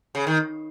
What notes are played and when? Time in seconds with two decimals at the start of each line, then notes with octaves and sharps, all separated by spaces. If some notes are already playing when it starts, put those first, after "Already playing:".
0.15 C#3
0.27 D#3